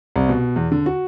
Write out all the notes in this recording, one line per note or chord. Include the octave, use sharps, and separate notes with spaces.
C2
B2
E2
D3
F#4